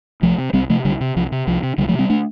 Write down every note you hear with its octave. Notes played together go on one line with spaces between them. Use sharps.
C2 F3 A3
C3
C2 G3 C4
C3 F3 A3
C2 D3 G3
C3
C2 F3
C3
C2 F3
C3
C2 D3 G3
F3 A3
C3
G3 C4
A3 D4